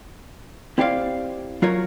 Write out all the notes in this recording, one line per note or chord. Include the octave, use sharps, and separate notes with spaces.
C4 E4 G4 C5 D5 F5
F#3 F4 A#4 C#5